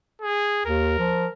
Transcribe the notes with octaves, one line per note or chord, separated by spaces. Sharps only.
G#4
D#2 A#4
F3